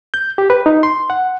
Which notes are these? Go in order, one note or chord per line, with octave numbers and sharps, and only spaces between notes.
G6
G4
B4
D#4
C6
F#5